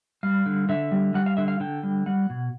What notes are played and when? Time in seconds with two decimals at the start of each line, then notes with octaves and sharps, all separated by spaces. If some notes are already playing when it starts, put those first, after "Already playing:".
0.23 G3 F5
0.46 D3
0.69 D3 E5
0.92 G3
1.14 G3 F#5
1.26 F5
1.37 D3 E5
1.48 F5
1.60 D3 G5
1.83 G3
2.06 G3 F#5
2.30 B2